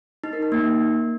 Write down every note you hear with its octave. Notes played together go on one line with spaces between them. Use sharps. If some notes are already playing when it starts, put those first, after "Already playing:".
D#4
A#4
D#4
A#3